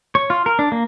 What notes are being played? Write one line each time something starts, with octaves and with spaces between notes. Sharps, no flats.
C#5
F4
A#4
D4
A#3